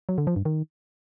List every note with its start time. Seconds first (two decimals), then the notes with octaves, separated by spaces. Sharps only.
0.09 F#3
0.18 D3
0.27 F3
0.36 G2
0.45 D#3